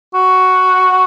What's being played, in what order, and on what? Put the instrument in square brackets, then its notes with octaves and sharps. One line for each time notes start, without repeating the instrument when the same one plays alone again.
[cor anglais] F#4